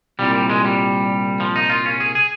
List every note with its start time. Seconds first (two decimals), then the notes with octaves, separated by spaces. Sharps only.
0.19 C2 A#2 G3
0.35 G3
0.50 G#3
0.65 G3
1.40 F3
1.55 D#4
1.70 F4
1.85 C#4
2.00 G#4
2.15 G#4